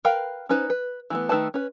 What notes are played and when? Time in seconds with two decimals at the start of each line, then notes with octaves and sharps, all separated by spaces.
0.05 A#4 B4 F5 G5 B5
0.49 C#4 D#4 B4 C5
0.70 B4
1.10 E3 A3 B3
1.29 D#3 A3 A4 B4 A5
1.54 C#4 B4